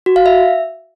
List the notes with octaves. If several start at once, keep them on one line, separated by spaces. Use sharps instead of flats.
F#4
F5
E5